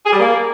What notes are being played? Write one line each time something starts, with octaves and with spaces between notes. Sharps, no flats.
G#4
G3
A#3